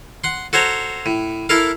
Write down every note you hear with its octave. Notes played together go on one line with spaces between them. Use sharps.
F#5 C6
F#4 A4 C5 C#5 A#5
A2
E4 A4 A#4 F5